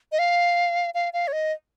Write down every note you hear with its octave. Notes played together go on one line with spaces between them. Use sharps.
D#5
F5
F5
F5
C#5
D#5